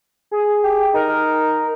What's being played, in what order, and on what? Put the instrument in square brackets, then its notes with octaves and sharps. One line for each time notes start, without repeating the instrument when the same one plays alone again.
[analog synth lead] G#4
[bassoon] G4
[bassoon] D#4 [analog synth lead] A#4